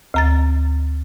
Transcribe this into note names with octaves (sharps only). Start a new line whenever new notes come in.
D2 A#5 A6